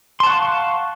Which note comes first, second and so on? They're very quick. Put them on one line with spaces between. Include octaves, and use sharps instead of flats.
C6 A5 F#5 C#6 F5